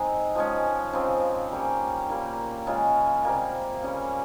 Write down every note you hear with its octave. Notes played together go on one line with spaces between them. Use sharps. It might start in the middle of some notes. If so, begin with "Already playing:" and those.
Already playing: G#3 C4 D#4
F3 G#3 C#4
C#3 F3 C4 F4
G3 A#3 C#4 G4
A#2 G3 A#3
C#3 G#3 C#4 F4
C3 G3 A#3
C#3 G3 C#4